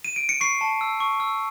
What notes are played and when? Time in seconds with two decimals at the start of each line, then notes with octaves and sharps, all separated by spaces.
0.05 D#7
0.16 D7
0.29 C#7
0.41 C#6 C7
0.61 A5
0.81 E6
1.00 C#6
1.20 E6